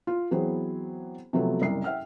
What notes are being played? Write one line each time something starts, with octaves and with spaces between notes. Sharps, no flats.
F4
E3 F#3 B3 C4 G#4 C5
C3 F3 F#3 A3 B3 C4
F#1 C2 C7
E5 F#5 G5 F6